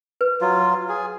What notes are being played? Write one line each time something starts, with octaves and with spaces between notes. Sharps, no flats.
B4
F#3 F4
G#4